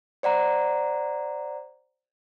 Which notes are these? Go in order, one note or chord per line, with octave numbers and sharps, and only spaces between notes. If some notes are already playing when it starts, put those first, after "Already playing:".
C5 D5 F#5 A#5